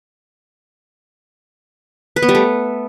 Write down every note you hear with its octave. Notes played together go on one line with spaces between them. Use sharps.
B4
B3
G3
A3